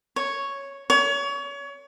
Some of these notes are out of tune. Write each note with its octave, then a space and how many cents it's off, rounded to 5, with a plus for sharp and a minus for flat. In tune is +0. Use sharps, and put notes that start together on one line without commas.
C#5 +0
C#5 +30